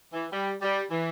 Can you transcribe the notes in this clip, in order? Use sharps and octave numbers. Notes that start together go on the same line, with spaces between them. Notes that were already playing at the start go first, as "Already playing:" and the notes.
E3
G3
G3
E3